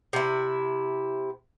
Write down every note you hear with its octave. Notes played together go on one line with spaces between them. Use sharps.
C3 E4